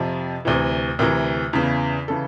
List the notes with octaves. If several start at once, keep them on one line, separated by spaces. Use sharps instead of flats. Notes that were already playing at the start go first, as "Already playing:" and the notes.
Already playing: F2 C3 F3
D2 C3 E3
D2 C3 E3 A#4
E2 C#3 E3
C#3 E3 A4